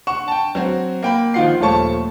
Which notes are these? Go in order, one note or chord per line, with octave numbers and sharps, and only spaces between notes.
F#5 C#6 E7
G5 A5
F#3 C4 F#4
A#3 G5 B5
D#3 F3 F4 F#5 C7
D#1 F3 A3 C#5 A5 C#6